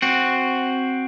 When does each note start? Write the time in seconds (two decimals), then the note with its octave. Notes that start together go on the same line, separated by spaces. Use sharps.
0.02 C4 F#4